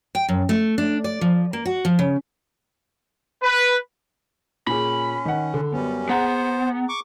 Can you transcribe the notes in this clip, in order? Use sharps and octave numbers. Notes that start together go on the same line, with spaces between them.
G5
F#2
A3
D4
D5
F3
A#3
F#4
F3
C#3
B4
A#2 C#4 G#4 B5
D#3 F#5
D3
F#2 G3 B3 C#4
B3 G#4 C5 F#5 A#5
C#6 D6